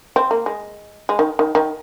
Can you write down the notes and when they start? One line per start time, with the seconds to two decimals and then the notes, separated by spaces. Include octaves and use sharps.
0.16 C4
0.31 A#3
0.46 G#3
1.09 G#3
1.19 D#3
1.39 D#3
1.55 D#3